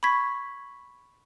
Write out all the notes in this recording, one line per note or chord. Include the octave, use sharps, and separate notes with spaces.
B5 C#6 G#6 B6